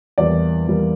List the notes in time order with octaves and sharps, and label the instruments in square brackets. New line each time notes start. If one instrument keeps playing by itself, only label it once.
[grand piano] E2 E3 G3 A#3 D5
E2 E3 G3 A#3